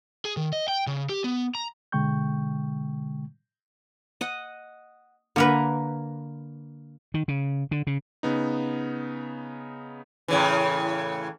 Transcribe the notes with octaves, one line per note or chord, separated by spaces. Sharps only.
G#4
D#3
D#5
G5
C#3
G4
B3
A#5
B2 D3 G#3 G5 C#6 G6
D#5 F#5
D3 A#3 A#4 B4 G#5 A#5
D#3
C#3
D3
C#3
C#3 B3 D#4
A2 C#3 E3